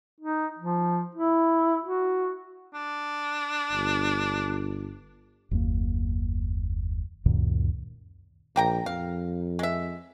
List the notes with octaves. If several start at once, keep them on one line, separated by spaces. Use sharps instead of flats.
D#4
F3
E4
F#4
D4
G1
F#1 D#2 A#3
C#2 F#2 A#2 D#3
A#1 A#3 G5 A#5
F2 F5
G#3 E5